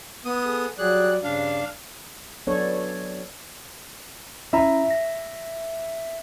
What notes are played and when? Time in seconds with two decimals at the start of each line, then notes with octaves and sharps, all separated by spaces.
0.25 B3 D#6
0.45 G#4 A4
0.78 F#3 G3 G#4 D5 F#6
1.23 G2 C#3 D4 F5
2.47 F#3 B3 D4 A4 C#5
4.53 C#4 E4 E5 A#5
4.90 A#6